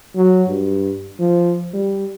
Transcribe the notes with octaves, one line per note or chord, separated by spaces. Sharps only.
F#3
G2
F3
G3